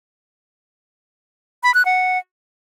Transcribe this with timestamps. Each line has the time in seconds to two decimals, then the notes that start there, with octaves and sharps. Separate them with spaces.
1.64 B5
1.74 F#6
1.85 F#5